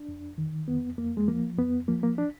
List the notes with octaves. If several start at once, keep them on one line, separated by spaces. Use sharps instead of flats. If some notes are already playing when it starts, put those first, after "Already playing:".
Already playing: D4
F2
D#3
F2 B3
F2 A#3
G#3
F3 A#3
F2 B3
F3 A#3
A#3
D4